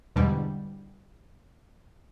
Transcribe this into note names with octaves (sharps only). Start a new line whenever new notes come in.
E2 G#2 B2 D3 G3